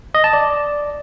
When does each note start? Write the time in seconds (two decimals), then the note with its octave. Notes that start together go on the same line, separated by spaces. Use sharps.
0.15 D#5
0.24 A5
0.33 D5